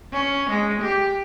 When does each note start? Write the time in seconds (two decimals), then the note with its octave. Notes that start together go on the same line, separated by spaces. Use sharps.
0.13 C#4
0.50 G#3
0.82 G4